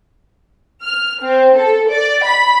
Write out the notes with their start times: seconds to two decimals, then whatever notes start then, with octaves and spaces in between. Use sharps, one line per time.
0.82 F6
1.21 C4
1.56 A4
1.89 D5
2.24 B5